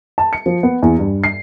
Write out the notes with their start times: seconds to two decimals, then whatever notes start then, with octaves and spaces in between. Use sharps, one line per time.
0.18 A5
0.33 C#7
0.46 F3
0.63 B3
0.82 E2
0.99 G2
1.24 C7